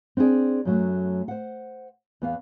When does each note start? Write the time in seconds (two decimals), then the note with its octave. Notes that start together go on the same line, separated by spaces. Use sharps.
0.17 C4 D4 E4 G#4 D5
0.65 F#2 F#3 A3
1.28 C5 F#5
2.22 E2 B3 F5